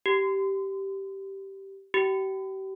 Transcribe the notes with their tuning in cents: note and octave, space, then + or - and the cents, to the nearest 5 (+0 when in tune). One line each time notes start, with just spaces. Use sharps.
G4 -10
G4 -35